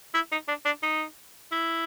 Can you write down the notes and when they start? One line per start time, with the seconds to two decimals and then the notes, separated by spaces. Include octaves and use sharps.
0.14 E4
0.32 D#4
0.48 D4
0.65 D4
0.83 D#4
1.52 E4